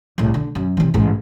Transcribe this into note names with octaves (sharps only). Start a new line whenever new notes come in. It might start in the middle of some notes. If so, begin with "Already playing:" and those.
C2 A2
D3
F#2
C3 E3
A1 G#2